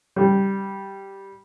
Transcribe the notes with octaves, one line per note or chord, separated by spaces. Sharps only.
G3